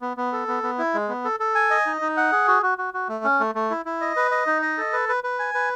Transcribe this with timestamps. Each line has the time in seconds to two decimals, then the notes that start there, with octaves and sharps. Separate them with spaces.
0.02 B3
0.17 B3
0.33 A4
0.48 B3
0.63 B3
0.78 E4
0.94 G#3
1.09 B3
1.25 A4
1.40 A4
1.55 G#5
1.70 D#5
1.86 D#4
2.01 D#4
2.17 F#5
2.32 G#4
2.47 F#4
2.63 F#4
2.78 F#4
2.94 F#4
3.09 A3
3.24 C#4
3.40 A3
3.55 A3
3.70 E4
3.86 E4
4.01 D#5
4.16 B4
4.31 D#5
4.47 D#4
4.62 D#5
4.78 A4
4.93 B4
5.09 B4
5.24 B4
5.39 G#5
5.54 B4